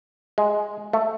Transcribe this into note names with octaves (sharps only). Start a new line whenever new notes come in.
G#3
A3